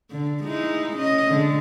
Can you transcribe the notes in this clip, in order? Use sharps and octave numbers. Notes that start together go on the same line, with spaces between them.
D3
G#3 D#4 E4
C#4 D#5
D3 G#3